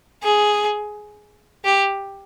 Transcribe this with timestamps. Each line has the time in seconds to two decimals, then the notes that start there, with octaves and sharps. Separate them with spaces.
0.23 G#4
1.65 G4